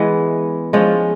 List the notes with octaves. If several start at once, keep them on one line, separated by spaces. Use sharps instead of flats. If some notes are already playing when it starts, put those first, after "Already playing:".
Already playing: E3 G#3 B3
F3 G#3 C#4 F4